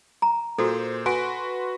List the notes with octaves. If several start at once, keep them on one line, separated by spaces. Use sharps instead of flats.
A#5
A#2 F#4 A4 C5
F#4 B4 G#5 C6